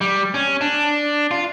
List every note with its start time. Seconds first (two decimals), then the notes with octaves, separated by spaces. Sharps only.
0.01 G3
0.34 C#4
0.61 D4
1.31 F4